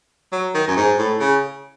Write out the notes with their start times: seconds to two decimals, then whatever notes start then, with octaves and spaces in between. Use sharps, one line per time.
0.32 F#3
0.54 D#3
0.68 F#2
0.76 G#2
0.98 A2
1.20 C#3